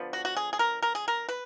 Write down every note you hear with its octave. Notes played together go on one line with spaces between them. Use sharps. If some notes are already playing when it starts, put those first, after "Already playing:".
Already playing: D3 F3 B3
F#4
F#4
G#4
G#4
A#4
A#4
G#4
A#4
B4